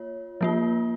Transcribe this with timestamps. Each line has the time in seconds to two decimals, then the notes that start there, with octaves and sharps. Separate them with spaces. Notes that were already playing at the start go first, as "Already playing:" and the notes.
Already playing: A#3 F4 C#5
0.41 F3 A#3 F4